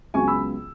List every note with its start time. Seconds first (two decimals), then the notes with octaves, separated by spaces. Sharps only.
0.14 C#2 C#3 F#3 B3 G#5 C#6
0.27 B5 E6